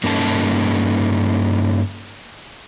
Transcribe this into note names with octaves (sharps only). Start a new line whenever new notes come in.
G2 A#3 C#4 D#4 A4 A5